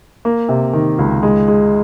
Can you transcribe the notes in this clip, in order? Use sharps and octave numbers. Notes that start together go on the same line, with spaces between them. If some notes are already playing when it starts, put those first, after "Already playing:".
A#3
C3
D#3
C#2
G#3
G#3